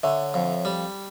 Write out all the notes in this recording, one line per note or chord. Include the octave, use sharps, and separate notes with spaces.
D3 C#5 E5
F2
G3